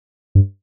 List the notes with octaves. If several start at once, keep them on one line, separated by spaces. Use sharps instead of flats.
G2